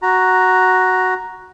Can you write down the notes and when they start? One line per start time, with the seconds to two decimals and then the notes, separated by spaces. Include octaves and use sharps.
0.02 F#4 A#5